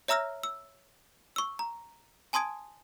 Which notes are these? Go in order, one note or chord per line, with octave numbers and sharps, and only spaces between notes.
C#5 E5 A#5 E6 F6 A#6
E6
C#6 E6
A#5
G#5 A5 C6 D#6 G#6 D7